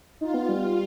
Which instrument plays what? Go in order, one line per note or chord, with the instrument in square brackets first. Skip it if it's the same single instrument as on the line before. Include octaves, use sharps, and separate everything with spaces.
[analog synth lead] D#4 [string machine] F4
[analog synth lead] B3
G3